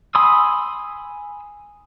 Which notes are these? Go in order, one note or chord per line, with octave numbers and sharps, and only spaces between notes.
G#5 B5 C6 D#6 E6